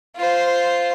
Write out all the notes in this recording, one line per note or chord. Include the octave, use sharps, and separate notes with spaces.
F4 C5